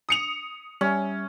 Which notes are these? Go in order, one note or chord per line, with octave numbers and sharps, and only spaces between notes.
D#6 C#7 F7
G3 C#4 E5